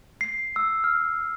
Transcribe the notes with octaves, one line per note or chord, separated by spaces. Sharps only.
C7
E6
F6